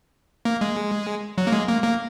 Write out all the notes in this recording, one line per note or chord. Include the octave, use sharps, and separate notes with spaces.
A#3
G#3
F#3
A#3
G#3
A#3
A#3